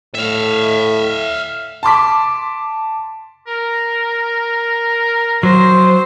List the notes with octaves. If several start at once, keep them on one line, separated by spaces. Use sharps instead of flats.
A2 E5 F5
A5 C6 D6 B6
A#4
F#3 C5